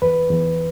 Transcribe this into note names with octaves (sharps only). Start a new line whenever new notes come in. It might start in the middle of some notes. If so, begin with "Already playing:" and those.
E2 B4
E2